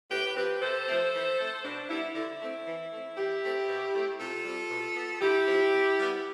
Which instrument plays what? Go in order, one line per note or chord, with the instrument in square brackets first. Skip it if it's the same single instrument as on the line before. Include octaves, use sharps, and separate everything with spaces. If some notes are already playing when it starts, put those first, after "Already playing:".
[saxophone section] A2 G4 B4
F3 C4 G4 B4
B4
C3 A4 C5
F3 A3 C4
E3
A3 C4
B2 D4
G3 B3 E4
D3 E4
A3 C4
E3
A3 C4
E3 E4 G4
A3 C4
B2
A3 C4
C3 F4 A4
G3 C4
B2
B3
D3 E4 G4
F3 C4
C3
G3 B3